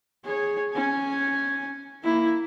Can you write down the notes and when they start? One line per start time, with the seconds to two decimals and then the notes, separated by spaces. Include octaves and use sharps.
0.25 G#4 C#5
0.74 C#4 G#5
2.04 A#3 E4